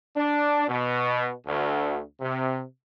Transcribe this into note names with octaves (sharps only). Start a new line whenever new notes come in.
D4
B2
D2
C3